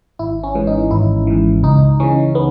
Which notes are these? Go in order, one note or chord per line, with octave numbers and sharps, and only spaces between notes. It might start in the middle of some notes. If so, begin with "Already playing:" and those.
G#1 E4
C#4
G#2 E3
D#4
G#1 E4
G#2 E3
C#2 D#4
C#3 E3 C#4
B3